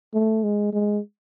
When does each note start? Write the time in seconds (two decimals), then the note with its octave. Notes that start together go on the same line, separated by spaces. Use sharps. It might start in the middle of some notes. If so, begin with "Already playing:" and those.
0.14 A3
0.43 G#3
0.73 G#3